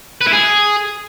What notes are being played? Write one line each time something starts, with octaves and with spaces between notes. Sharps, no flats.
B4
E4
G#4